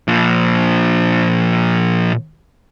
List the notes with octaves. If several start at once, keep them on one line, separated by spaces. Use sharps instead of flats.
A#2 F3